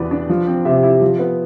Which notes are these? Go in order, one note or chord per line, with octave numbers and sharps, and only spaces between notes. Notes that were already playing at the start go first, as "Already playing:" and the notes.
Already playing: E2 B2 B3 B4 D5
D4
F3
C4
C3 E5
E4
F3
B3